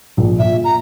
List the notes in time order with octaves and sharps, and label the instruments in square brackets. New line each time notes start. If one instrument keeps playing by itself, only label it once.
[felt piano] A#1
[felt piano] A#2 [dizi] E5
[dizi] A#5